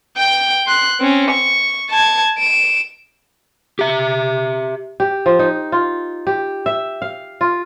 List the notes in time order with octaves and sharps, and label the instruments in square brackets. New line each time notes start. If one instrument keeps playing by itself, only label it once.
[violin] G5 G6
C6 F#6
C4 C#4
C#6
A5 G#6
D7 E7
[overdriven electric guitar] G4 E5
[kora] G4
F3
D#4
F4
G4
E5
F5
F4